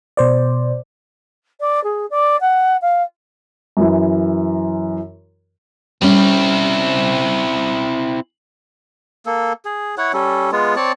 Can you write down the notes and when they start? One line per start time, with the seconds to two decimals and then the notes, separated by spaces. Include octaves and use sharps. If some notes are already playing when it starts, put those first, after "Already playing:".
0.17 B2 C5 D5
1.60 D5
1.84 G#4
2.10 D5
2.41 F#5
2.81 F5
3.77 F#2 E3
6.02 G3 C4 C#4 E4
9.26 A#3 A4
9.65 G#4
9.98 E4 C#5 F#5
10.14 G3 C#4 A4
10.52 G#3 B3 F4
10.76 C4 C#5 D5 A5